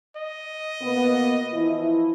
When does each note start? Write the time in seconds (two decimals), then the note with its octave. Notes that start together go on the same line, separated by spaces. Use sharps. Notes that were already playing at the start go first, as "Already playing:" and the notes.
0.16 D#5
0.81 B2 A#3 B3
1.52 E3 F3 E4